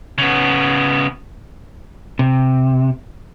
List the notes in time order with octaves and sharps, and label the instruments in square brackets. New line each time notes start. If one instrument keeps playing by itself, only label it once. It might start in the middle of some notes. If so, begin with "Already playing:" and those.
[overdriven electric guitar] C#3 B3
[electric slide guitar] C3